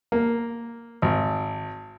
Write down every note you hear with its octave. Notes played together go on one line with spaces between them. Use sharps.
A#3
G#1